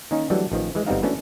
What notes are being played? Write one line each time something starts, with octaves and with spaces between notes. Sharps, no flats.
D#3 A#3 C#4 D#4
E3 F#3 G3 A3 D4
A1 D#3 F3
E3 G#3
G1 G3 B3 C4 D#4 F5
E3 A3 B3 C#4 D4 F#4